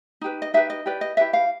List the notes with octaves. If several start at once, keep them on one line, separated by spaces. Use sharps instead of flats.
D#4 G4 B4
D#5
D#4 G4 B4 E5
D#5
E4 G4 B4 D5
D#5
E4 G4 B4 E5
F5